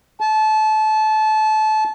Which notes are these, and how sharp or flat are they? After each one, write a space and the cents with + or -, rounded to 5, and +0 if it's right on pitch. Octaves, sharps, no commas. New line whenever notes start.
A5 -25